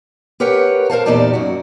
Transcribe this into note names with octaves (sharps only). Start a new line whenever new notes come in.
G4 A#4 B4 C#5 F#5 G5
A#4 C5 F5 A5
E2 A#2 D#4 G4 D5 A5
F#2 F#4